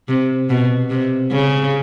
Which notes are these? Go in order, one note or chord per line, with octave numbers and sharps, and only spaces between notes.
C3
B2
C3
C#3